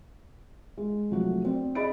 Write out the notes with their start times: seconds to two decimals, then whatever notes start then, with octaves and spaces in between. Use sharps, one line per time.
0.77 G#3
1.10 C3 F3 F#3 A3 F#4
1.44 C4 C5 D5
1.75 G#4 D5 D#5 B5 A6 D7